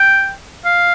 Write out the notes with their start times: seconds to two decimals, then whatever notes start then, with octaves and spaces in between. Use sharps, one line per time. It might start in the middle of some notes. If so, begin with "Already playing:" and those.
Already playing: G5
0.65 F5